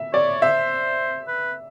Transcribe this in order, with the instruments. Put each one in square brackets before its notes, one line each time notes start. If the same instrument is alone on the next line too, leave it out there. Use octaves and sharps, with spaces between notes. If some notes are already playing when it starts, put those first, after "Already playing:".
Already playing: [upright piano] E5
[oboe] C#5 [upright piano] D5
[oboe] C5 [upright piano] E5
[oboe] B4